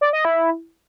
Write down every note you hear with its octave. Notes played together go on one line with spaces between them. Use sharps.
D5
D#5
E4